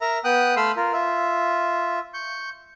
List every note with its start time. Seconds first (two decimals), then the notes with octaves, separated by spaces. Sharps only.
0.01 A#4 E5 A#5
0.24 B3 G5 D#6 F#6
0.57 A3 F5 B5 C6 E6
0.76 F4 A#4
0.93 F4 E5
2.14 C#6 G6